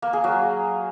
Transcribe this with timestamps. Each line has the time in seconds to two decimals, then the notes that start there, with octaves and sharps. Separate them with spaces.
0.02 A#3
0.13 G#4
0.24 F#3